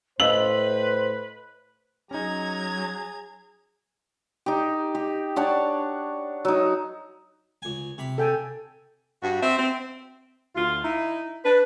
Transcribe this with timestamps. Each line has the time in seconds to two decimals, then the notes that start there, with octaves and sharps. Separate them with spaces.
0.20 A2 B4 C5 D#5 F5 E6 F#7
2.11 F#3 C#4 D#4 G#4 A#5 G#6
4.46 D#4 G4
4.95 G4
5.36 D4 C#5 F#5 A5
6.45 F#3 D#4
7.62 C#2 G#5
7.98 C3 B5
8.18 A4 G5 G#5
9.23 G2 F#4
9.43 C4 E5
9.59 C4
10.56 D2 F4
10.84 D#4 E4
11.45 D4 B4